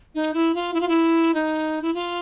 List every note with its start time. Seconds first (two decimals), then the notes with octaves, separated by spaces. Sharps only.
0.15 D#4
0.34 E4
0.55 F4
0.74 E4
0.81 F4
0.89 E4
1.34 D#4
1.82 E4
1.94 F4